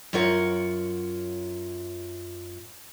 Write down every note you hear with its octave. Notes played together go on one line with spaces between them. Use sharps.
F#2 F4 A#4 C#5 F#5